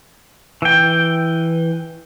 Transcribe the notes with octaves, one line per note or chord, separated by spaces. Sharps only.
E3 G5